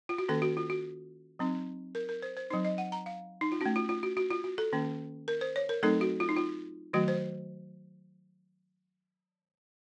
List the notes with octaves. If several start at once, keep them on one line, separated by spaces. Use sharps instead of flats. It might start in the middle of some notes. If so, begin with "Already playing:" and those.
F4
F#4
D#3 A#3 C#4 A4
F#4
F4
F#4
F#3 C4 D#4
A#4
A#4
C5
C5
F#3 C4 D#4 C5
D#5
F#5
A#5
F5
D#4
F4
A3 C#4 F#4
F4
F4
F#4
F#4
F4
F#4
A4
D#3 A#3 C#4
A#4
C5
C#5
A#4
F#3 A3 C4 D#4 A4
F#4
F4
D#4
F4
D#3 F#3 A3 F#4
C5